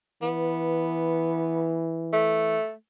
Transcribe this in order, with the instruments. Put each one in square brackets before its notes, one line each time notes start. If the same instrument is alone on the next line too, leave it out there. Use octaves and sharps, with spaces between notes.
[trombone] E3 [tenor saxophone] B3
[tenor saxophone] A3